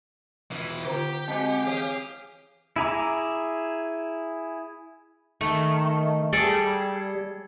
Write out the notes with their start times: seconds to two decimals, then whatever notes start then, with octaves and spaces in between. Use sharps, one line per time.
0.52 B2 E3 F4
0.85 D3 B3 F4 G4 C5 A#5
1.28 G#3 C4 F#4 D#5 G#5 C#7
1.64 E3 G#4 C#5 F5 D#6
2.76 E4 G#4 A#5 D6
5.41 D#3 A3
6.33 G3 G#4 A4 D5